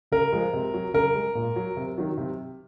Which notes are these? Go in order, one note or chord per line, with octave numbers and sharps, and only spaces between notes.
C#3 A#4
F3 G#3
C3
F#3
C#3 A#4
G#3
A#2
F#3
C3
D#3 F#3
C3